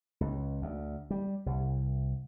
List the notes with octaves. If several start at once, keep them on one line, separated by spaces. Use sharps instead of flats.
C#2
D2
G3
C2